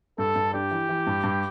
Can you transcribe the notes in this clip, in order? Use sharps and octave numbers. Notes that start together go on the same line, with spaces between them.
G2 A4
G2
D4 G4
E3
E3
G2
G2